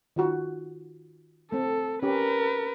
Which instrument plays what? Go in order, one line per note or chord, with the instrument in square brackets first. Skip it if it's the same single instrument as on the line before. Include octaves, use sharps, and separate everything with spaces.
[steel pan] D#3 F4 F#4
[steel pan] A3 C4 [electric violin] A4
[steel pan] C#4 G4 [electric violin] A#4 B4